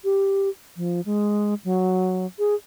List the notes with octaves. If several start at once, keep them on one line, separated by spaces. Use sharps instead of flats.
G4
F3
G#3
F#3
G#4